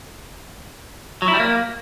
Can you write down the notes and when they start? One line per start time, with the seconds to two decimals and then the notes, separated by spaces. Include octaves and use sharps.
1.22 F#3
1.28 E4
1.34 G3
1.40 A#3